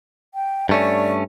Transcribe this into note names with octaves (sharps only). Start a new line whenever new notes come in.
G5
G2 A3 C#4 D5